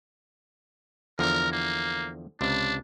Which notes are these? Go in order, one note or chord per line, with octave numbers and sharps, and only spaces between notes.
E2 D3 F3 A#4
A#3
C#2 C3 D4